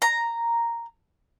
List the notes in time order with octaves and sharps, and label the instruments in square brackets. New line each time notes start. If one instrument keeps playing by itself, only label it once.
[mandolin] A#5